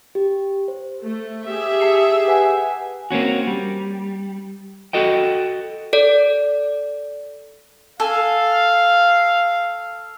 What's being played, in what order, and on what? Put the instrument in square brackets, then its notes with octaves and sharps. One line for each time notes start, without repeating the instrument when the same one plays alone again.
[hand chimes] G4
C5
[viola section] A3
G4 G#4 E5
[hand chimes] A5 C7 C#7
B4 F#5 G#5
[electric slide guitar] A#3 C4 C#4 F#4
G3
F#4 A4 D#5 G5
[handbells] A4 D5
[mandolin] A4 G#5 [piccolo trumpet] F5